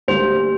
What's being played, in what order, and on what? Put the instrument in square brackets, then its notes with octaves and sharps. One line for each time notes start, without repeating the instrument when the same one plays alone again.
[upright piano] D2 D3 G3 A#3 [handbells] C5